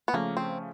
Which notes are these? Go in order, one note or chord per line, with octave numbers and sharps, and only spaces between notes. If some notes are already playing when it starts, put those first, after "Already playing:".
B3
C#3 F3 A3 A#3 C#4
C4